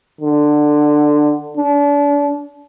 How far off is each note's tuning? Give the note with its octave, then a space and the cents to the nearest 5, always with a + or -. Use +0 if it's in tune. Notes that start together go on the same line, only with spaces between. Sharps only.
D3 +15
D4 -35